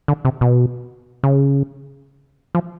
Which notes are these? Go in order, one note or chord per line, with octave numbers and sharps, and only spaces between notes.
D3
C3
B2
C#3
F3